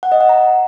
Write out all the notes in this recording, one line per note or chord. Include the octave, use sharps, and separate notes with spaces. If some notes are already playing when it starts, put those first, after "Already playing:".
F#5
D#5
F#5
A#5